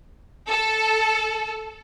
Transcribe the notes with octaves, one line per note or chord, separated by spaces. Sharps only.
A4